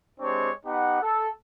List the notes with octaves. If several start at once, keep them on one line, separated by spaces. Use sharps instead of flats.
G#3 C4 D4 G4 C#5
B3 D#4 G4 F#5
A4